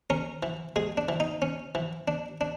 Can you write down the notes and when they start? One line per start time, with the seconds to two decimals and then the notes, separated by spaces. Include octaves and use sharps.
0.10 C#4 A#4
0.43 E3
0.76 G#3 G#4
0.97 D4
1.09 E3
1.20 D#4
1.42 C#4
1.75 E3
2.08 D4
2.41 D4